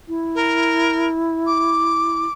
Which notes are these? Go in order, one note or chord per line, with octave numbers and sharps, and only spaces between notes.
E4
A#4
D6